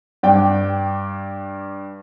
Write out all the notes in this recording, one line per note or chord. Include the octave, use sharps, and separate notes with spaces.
G2 D5 G5